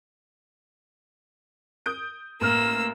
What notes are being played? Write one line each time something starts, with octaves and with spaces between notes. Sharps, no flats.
D#6 G6 D7
A1 A#3 E6 F6